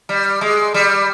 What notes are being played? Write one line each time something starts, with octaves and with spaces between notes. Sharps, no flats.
G3
G#3
G3